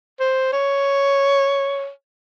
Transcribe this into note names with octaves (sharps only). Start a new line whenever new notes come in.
C5
C#5